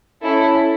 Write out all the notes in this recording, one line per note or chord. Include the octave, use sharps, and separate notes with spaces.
C#4 E4 A4